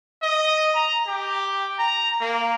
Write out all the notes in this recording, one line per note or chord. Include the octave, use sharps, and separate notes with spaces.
D#5
A#5
G4
A#5
A#3